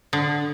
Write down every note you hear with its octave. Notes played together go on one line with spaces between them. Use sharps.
D3